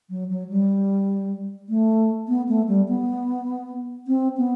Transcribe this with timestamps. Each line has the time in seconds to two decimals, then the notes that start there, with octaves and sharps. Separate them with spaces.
0.10 F#3
0.30 F#3
0.49 G3
1.69 A3
2.28 B3
2.49 A3
2.68 G3
2.88 B3
4.07 C4
4.38 B3